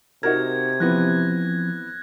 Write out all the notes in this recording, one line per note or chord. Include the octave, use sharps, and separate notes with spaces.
C3 D#4 F#4 A#4 G#6
E3 F3 B3 C4 F#6 A#6